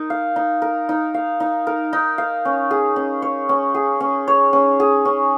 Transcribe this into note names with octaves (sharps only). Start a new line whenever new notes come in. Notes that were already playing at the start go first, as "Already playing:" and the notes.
Already playing: D#4 A#4
F5
D#4
A#4
D#4
F5
D#4
A#4
D#4
F5
C#4
G#4
C#4
C#5
C#4
G#4
C#4
C#5
C#4
G#4
C#4